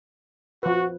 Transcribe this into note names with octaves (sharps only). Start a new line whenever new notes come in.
F3 F#4 B4